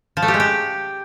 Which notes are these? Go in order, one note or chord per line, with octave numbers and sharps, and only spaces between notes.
F3
A3
G4
G#3
G4